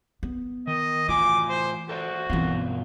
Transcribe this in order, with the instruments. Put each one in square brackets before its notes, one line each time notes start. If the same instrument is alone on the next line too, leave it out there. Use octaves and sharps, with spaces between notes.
[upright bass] B3
[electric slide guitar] D#3 [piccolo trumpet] D#5
[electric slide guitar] A2 F4 G#5 [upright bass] E3 [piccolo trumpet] D6
[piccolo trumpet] C5
[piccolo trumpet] F#4 [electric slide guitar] A4 C5 D5
[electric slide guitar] G2 B2 F4 [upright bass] E3 C4